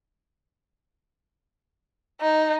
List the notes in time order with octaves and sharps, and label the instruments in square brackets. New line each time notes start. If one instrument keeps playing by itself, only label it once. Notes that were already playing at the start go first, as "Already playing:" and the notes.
[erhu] D#4